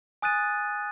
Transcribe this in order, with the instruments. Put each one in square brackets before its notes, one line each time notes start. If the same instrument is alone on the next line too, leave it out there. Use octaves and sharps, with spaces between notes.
[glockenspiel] G#5 D#6 F#6 A6 D#7